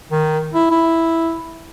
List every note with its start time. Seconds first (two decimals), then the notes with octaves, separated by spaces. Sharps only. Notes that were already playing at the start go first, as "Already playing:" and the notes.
0.11 D#3
0.54 E4
0.71 E4